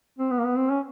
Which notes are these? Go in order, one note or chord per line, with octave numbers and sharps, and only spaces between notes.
C4
B3
A#3
B3
C4
C#4